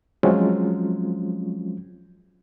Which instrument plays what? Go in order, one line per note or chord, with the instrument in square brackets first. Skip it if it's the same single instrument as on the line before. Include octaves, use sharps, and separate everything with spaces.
[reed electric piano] F3 F#3 G#3 C4 C#4 F4